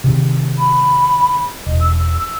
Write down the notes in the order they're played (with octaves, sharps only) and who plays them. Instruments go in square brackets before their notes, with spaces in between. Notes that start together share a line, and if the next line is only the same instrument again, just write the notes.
[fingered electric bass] C3 D#3
[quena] B5
[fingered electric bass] E1 [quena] D#5
[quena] E6